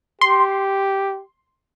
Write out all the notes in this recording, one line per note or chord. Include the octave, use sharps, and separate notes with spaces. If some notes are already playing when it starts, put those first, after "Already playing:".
G4 C6